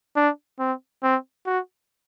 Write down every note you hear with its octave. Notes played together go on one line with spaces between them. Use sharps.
D4
C4
C4
F#4